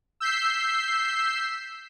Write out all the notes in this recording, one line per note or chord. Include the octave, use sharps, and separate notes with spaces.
E6 G6 B6 C7